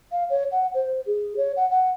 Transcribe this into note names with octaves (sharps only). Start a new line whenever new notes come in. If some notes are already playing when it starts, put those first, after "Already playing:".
F5
C#5
F#5
C5
G#4
C#5
F#5
F#5